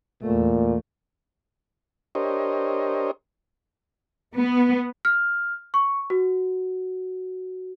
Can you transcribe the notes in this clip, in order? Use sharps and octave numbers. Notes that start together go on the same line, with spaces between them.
E2 A#2 A3
D4 G4 A#4 C5 C#5 D#5
B3
F6
C#6
F#4